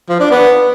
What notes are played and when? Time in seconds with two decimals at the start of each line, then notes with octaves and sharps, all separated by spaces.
0.10 F3
0.20 D4
0.31 B3